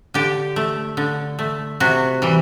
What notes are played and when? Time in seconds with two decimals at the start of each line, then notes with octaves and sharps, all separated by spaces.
0.14 D3 G4
0.56 A3
0.97 D3
1.39 A3
1.80 C3 F#4
2.22 E3 G3